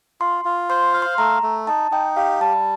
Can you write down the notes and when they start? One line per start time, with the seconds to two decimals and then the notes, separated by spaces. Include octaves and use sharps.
0.21 F4 C6
0.45 F4
0.70 C5 C6
0.94 F5
1.02 C6
1.18 A3 A#5
1.43 A3
1.67 D#4 A5
1.91 D#4 G5
2.17 G4 F5
2.41 G3 A5